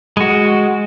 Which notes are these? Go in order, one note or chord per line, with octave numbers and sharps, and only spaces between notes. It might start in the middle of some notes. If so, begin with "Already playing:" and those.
G#3 F#4